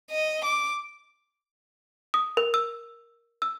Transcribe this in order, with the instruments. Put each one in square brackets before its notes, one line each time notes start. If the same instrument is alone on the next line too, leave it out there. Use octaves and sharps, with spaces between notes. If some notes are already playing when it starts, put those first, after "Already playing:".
[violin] D#5
D6
[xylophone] D#6
A#4
E6
E6